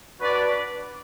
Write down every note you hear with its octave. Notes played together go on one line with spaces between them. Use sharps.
D4 F#4 B4 D5